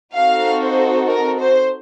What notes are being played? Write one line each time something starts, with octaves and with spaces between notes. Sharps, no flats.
C4 D#4 F#4 A4 F5
C5
A#4
C5